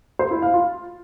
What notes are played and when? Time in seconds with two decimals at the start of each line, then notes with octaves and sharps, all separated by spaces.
0.19 C5
0.31 E4
0.42 F5
0.54 F4